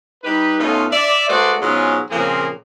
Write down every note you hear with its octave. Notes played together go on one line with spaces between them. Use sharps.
G3 D#4 G4 B4
B2 A3 C#4 D#4 F4
D5 E5
G#3 A3 F#4 B4 C5 D5
G#2 B2 F#3 G#3 C#4 F4
A#2 C#3 F3 A#3 C4 G#4